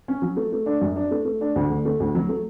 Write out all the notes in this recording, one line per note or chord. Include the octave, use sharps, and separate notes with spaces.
C#4
F#3
A3
A3
D4
F#2
D4
A3
A3
D4
D2
D3
A3
D2
F#3
A3